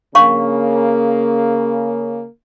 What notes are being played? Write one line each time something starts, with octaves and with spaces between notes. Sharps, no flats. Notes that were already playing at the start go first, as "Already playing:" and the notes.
C#3 A#3 D4 F5 C#6